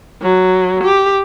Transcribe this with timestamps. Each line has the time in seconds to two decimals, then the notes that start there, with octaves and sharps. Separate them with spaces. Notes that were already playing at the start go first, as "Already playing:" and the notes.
0.21 F#3
0.84 G4